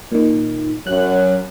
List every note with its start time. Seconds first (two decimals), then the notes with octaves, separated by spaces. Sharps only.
0.12 A#2 D#3
0.87 F#2 F#3 F#6